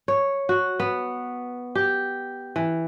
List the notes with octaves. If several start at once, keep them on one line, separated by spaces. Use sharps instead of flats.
C#5
F#4
B3
G4
E3